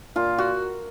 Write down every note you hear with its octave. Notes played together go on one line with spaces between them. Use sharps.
A#2 F4
F#4